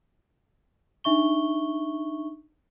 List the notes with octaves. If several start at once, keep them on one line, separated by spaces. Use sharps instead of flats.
D4 D#4 E5 C#6 G7